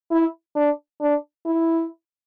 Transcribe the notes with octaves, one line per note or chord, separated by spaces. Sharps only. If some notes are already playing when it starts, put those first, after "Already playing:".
E4
D4
D4
E4